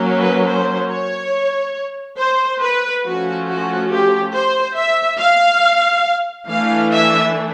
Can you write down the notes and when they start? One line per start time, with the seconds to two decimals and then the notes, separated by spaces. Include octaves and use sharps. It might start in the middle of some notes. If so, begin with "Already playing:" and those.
Already playing: F#3 A#3 C#4
0.18 B4
0.46 C5
0.89 C#5
2.19 C5
2.61 B4
3.04 F3 A3 C#4 F#4
3.47 F#4
3.90 G4
4.33 C5
4.76 E5
5.19 F5
6.48 E3 A3 D4 F5
6.91 E5